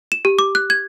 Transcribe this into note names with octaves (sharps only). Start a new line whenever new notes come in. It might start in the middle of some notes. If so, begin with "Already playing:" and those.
E7
G4
D6
F#6
G#6